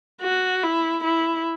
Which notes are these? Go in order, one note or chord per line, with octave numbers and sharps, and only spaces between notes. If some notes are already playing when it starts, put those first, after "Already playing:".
F#4
E4
E4